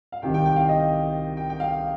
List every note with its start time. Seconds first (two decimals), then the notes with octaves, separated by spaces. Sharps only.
0.12 F5
0.22 C2 C3 D#3 G5
0.34 G5
0.45 G5
0.56 F5
0.69 D#5
1.37 G5
1.49 G5
1.60 F5